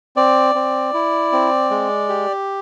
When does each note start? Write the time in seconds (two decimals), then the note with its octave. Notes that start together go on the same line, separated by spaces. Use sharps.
0.16 C4 D5
0.55 C4
0.94 E4
1.32 C4
1.70 G#3
2.09 G4